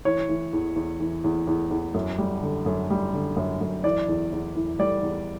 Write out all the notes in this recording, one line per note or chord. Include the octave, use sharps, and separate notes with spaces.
E3 C#5
E3
E2
E2
E3
E2
E2
E2
F#2
G3
D3
F#2
G3
D3
F#2
F#2
E3 D5
E2
E2
E3
G3 D5
E2